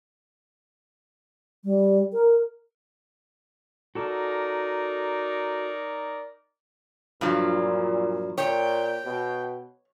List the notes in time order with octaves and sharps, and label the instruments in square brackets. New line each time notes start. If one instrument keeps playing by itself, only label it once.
[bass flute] G3
A#4
[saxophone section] D#4 A#4 D5 [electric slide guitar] F#4 A4
[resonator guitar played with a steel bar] G2 F3 F#3 [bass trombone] A#2
[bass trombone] A#2 [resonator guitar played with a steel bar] C#5 [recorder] G5
[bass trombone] B2